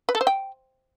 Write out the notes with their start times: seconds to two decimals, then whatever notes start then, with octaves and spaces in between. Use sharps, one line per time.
0.09 B4
0.15 A4
0.21 C5
0.27 G5